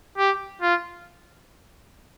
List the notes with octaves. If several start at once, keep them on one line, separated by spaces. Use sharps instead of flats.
G4
F4